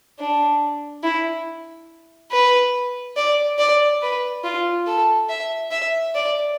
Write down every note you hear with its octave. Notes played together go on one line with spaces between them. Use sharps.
D4
E4
B4
D5
D5
B4
F4
A4
E5
E5
D5